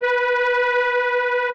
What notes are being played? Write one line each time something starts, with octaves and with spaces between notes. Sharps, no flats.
B4